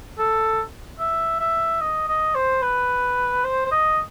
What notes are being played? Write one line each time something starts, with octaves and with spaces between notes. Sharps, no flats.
A4
E5
E5
D#5
D#5
C5
B4
C5
C5
D#5